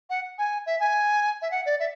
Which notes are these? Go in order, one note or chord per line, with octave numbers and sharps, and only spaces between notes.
F#5
G#5
E5
G#5
E5
F#5
D5
E5